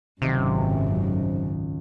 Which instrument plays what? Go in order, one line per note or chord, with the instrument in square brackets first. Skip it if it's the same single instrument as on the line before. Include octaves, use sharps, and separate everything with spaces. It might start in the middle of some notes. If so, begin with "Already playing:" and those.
[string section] G#1 F#2 [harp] C#2 D#3 [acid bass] C3